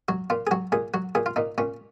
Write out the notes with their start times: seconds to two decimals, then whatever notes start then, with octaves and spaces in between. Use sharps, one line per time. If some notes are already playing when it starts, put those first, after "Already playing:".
0.08 F#3 F#4
0.30 A#2 F4
0.47 G#4
0.51 F#3 F#4
0.72 A#2 G#4
0.94 F#3 F#4
1.15 A#2 G#4
1.26 F4
1.36 A#2 D#4
1.58 A#2 C#4